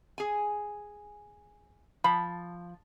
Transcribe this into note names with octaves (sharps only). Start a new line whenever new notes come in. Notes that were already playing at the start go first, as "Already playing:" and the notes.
G#4 G#5
F3 B5